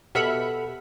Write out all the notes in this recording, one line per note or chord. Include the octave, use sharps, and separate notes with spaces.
B2 G4 A4 E5 F#5 B5 F6 C#7